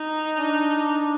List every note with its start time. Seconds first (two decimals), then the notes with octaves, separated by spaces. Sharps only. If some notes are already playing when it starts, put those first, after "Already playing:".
Already playing: D#4
0.37 D4